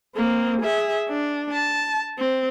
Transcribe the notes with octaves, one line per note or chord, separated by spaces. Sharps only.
A#3 C4
G#4 E5
D4
A5
C4